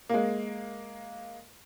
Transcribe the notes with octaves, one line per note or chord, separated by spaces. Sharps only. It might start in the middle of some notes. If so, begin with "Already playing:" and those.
G#3 A#3